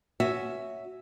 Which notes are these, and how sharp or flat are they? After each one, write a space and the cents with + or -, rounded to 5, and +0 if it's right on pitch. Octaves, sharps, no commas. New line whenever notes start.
C#4 +0 F#4 +0 E5 +0